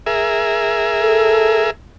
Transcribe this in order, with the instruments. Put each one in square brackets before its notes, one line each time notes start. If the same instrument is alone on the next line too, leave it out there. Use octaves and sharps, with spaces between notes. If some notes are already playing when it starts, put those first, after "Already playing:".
[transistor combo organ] G#4 A#4 E5
[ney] A4